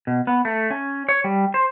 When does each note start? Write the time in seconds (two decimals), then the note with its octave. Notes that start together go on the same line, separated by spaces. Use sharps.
0.07 B2
0.27 B3
0.45 A3
0.71 C#4
1.09 C#5
1.24 G3
1.54 C5